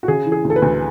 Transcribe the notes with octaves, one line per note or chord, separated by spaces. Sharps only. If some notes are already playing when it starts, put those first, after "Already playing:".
F#4
C#3 G#4
E3
G#4
D2
A4
B4
D2